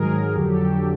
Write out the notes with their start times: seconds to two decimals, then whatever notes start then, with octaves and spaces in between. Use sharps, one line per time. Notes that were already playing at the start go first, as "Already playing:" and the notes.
Already playing: G#2 D#3 F#3 G#4 A#4
0.35 F2 D3 F#3 G4 A4